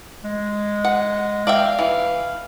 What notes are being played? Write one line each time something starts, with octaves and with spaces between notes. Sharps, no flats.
G#3
F#5
D5 E5 F5 G5
E3